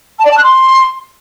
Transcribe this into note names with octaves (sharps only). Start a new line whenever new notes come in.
A5
D5
A5
F#6
C6